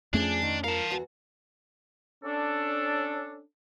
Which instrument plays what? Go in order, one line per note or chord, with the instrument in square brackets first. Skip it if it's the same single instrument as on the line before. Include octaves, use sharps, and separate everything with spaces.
[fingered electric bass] F2 A3 C#4 [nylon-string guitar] F3 G#4 [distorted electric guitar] D4
[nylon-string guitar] D#3
[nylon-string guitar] F4 A#4 [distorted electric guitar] F5 A5
[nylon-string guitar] E2 F#4
[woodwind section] C#4 D4 A4